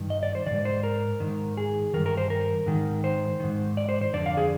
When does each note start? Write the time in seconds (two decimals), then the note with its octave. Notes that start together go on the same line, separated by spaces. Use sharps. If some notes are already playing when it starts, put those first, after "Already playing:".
Already playing: G2 D#3
0.10 D#5
0.23 D5
0.35 C5
0.47 D#3 D5
0.51 G#2
0.65 C5
0.84 A#4
1.20 G#2 D#3
1.57 G#4
1.93 G2 D#3 A#4
2.06 A#4
2.17 C5
2.30 A#4
2.66 G#2 D#3
3.04 C5
3.40 G#2 D#3
3.77 D5
3.89 C5
4.01 C5
4.13 F2 D3 D5
4.26 F5
4.37 G#4